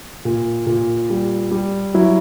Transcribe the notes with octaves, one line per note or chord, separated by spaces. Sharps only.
A#2
A#2
G3
G3
F#3 E4